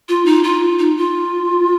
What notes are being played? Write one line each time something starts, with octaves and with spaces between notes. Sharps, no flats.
F4
D#4
F4
D#4
F4